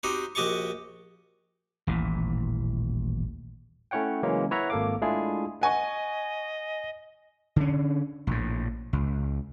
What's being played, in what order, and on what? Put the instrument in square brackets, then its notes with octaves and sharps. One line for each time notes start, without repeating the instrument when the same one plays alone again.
[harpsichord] C4 D#4 F#4 G4
A#1 F#4 G4 D#5 A5 C#6
[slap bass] D#1 A1 A#2 E3
[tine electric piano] A3 C#4 E4 C#5 F#5 G5
C#3 E3 F#3 G#3 A#3 C#4
E4 B4 C#5 E5 F#5 A#5
G#1 A#3 A4 F5 D6
G#3 A3 D4 E4 F4 G#4
[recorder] D#5 [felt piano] F#5 G#5 C#6
[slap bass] D3 C#4
A#1 A2
C#2